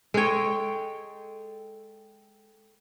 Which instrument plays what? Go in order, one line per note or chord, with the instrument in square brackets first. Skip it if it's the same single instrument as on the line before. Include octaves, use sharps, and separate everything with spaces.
[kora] G#3 C#5 [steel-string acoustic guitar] A4 G5